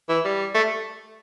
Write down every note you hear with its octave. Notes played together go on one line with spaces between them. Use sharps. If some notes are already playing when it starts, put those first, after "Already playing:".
E3
G3
A3